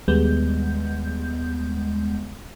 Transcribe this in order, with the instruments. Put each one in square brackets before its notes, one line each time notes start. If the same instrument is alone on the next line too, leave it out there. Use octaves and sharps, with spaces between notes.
[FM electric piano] D#2 G3 G#3 B3 G6